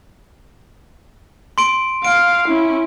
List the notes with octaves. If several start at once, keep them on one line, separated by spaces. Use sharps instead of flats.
C6 D7
F5 D7
C#4 E4